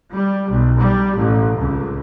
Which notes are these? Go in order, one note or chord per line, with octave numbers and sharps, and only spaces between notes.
G3
B1
G3
A1
C#2